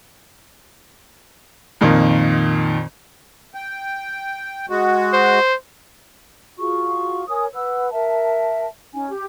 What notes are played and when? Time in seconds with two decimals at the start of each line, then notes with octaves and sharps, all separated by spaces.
1.81 F2 A#2 D#3 A#3 F4
3.54 G5
4.70 G#3 F#4
5.13 C5
6.59 F4 F#4 G#4 C#6
7.28 A#4 C#5 G#5 D#6
7.53 B4 F#5 E6
7.91 A#4 E5 A5
8.94 C#4 D#4 G#5
9.09 G4